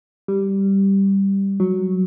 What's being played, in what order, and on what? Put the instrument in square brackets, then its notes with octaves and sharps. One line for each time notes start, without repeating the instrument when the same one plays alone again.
[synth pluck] G3
F#3